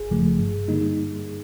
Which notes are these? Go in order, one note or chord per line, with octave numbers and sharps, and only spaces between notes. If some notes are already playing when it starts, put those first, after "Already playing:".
Already playing: G1 G#4
F#2 C#3 F3 A3
G2
D3 G3 A#3 D#4